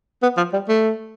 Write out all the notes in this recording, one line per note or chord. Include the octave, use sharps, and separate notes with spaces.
B3
F3
G3
A3